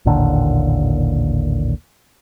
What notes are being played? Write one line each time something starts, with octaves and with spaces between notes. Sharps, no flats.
A1 D#2 A#2 D3